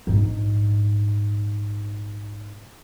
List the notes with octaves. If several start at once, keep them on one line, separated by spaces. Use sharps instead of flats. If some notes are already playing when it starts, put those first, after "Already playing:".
A#1 G#2